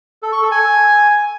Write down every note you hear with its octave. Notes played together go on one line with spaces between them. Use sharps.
A4
C#6
A4
G#5